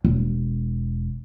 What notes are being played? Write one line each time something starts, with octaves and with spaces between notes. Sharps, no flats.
E1